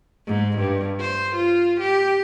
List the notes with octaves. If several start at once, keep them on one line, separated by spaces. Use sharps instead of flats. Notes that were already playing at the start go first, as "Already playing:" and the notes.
G#2
G2
C5
F4
G4